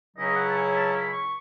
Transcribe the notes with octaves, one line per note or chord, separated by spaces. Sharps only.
C#2 C#3 F#3 C#4 E4 D#5
F#5
A5
G#5
A5
B5
C#6